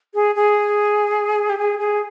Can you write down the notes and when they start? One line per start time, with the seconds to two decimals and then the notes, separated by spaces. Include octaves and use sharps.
0.14 G#4
0.35 G#4
1.49 G4
1.58 G#4
1.79 G#4